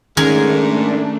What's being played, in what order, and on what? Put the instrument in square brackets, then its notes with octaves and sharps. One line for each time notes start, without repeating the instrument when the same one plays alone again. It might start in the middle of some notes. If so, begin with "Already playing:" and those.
[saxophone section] G#2 [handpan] D#3 C#4 [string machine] A3 D4 [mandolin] G#4 A#4